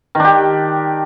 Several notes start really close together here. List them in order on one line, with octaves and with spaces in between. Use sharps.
D#3 D4 G4